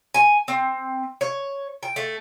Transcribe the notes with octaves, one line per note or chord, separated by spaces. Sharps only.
G#5
C4
C#5
G5
A3